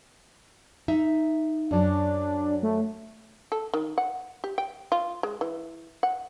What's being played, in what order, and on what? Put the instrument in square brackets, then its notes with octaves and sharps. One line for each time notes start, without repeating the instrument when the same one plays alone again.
[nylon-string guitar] D#4 E5
[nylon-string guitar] F#2 F#3 [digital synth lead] D4
[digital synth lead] A3
[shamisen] A4
D#3
F#5
G4
G5
F4
G#3
E3
F#5